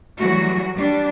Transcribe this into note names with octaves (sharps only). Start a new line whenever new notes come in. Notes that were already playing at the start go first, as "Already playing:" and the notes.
E3 F#3 G3 A3 F#4
G3 D4